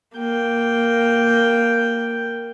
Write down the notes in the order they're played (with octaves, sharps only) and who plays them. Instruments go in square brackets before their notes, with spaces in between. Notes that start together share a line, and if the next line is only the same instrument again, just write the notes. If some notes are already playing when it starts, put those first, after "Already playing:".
[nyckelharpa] A#3 G5